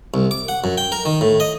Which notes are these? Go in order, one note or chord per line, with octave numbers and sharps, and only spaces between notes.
C2
D6
F#5
F#2
G5
A#4
D#3
A2
D#5